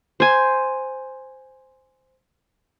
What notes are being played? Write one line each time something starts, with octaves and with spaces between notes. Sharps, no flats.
C5 G#5